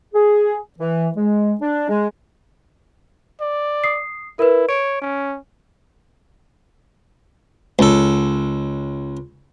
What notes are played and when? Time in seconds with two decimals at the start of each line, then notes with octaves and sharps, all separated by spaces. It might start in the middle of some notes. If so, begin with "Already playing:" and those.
0.14 G#4
0.78 E3
1.16 G#3
1.61 D4
1.89 G#3
3.41 D5
3.84 D#6 C7
4.39 E4 A#4 B4
4.69 C#5 D7
5.02 C#4
7.79 C#2 A4